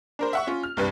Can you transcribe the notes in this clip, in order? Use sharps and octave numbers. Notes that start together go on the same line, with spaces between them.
D4 A#4 C5
E5 F#5 C#6
C#4 F4
F6
C2 G2 B4